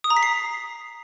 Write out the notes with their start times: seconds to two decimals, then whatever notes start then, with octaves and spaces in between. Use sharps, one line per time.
0.04 D#6
0.10 A#5
0.17 B6
0.23 C7